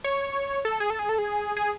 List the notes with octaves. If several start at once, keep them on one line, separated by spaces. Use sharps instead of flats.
C#5
A4
G#4
A4
G#4
A4
G#4
G#4